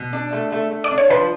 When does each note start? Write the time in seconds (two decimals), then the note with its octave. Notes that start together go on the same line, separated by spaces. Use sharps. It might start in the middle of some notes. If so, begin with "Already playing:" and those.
Already playing: B2
0.13 D4
0.33 A3
0.52 A3
0.71 A3
0.84 D5
0.91 D4
0.98 C#5
1.10 F3 B4